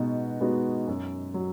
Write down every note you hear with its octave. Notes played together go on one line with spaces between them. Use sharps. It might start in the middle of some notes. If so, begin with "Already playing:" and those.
Already playing: B2 G#3 B3 D#4 F#4
G#3 B3 D#4 F#4
F#2
F#3